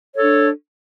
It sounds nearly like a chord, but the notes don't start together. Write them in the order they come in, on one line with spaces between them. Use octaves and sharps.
C#5 A4 D4